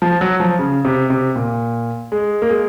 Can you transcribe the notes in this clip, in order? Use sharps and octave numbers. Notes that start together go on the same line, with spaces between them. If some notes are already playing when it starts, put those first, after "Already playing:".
F3
F#3
F3
C#3
C3
C3
A#2
G#3
A#3
G#3